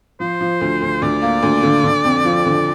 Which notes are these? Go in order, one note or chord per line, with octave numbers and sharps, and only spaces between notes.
F3 C5
F3
D2
D2
D2 D5
A#3
D2
D3
D3
F2
F3
D3